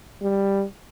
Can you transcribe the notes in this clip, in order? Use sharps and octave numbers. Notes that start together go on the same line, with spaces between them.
G3